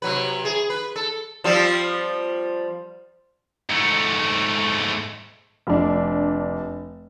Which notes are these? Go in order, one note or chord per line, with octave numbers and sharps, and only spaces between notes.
C3 F#3 B4
G#4
B4
A4
F3 G3 C4
G#2 A3
F1 D4